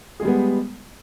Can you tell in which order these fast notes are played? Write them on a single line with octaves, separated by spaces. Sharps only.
G#4 G#3 G3 B3